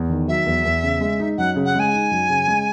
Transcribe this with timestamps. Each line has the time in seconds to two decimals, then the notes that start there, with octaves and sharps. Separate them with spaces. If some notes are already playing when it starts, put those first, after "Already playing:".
Already playing: E2
0.10 D#3
0.28 F#3 E5
0.46 E2
0.65 E2
0.83 C#3
1.01 G#3
1.20 D#4
1.38 F#2 F#5
1.56 C#3
1.65 F#5
1.75 G#3 G#5
1.93 D#4
2.11 F#2
2.29 C#3
2.48 G#3